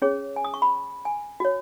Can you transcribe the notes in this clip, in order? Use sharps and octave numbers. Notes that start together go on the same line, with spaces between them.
C#4 G#4 C#5
G#5
D#6
C#6
B5
G#5
F#4 C#5